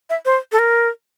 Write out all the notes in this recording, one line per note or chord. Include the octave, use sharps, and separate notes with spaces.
E5
C5
A4
A#4